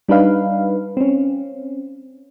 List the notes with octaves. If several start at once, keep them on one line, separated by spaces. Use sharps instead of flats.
G3 D4 D#4 B4 F5
C4 C#4